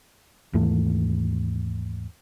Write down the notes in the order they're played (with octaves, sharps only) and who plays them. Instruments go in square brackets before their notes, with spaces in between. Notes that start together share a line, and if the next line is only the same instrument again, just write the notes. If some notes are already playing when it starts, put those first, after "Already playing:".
[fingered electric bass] D#2 G#2 E3 A3